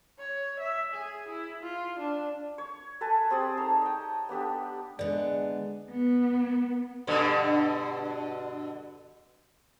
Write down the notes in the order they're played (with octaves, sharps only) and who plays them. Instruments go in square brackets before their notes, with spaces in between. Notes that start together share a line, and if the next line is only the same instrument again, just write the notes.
[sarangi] C#5
E5
G#4
E4
F4
D4
[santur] C#5
A4 B4 G#5 A5
C4 G4 G#4 D5
D#4 A4 C#5 A5
D#5 G5
B3 D4 G4 A4
[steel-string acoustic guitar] D3 B3 [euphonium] G#3 [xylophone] D5
[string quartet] B3
[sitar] G2 B2 D3